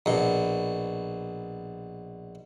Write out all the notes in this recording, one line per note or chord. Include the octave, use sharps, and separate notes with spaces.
A#1 B2